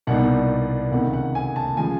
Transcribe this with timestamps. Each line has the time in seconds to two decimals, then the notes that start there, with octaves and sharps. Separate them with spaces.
0.07 C2 B2 G3 A#3 D#4 F#5
0.91 C#2 C3 D#3 F#5
1.13 F#5
1.35 G#5
1.56 A5
1.77 C#3 F3 G#3 G#5